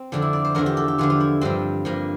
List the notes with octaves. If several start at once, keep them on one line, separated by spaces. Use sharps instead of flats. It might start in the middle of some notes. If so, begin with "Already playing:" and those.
Already playing: C4
F2 D3 F3 D4
E4
D5
C5
E2 D3 F3 A#4
G4
A4
G4
E2 D3 F3 F4
F4
E4
G2 F3 C4
G2 F3 A#3